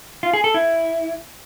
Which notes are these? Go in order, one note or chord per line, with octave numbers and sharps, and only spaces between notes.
F4
G#4
A4
E4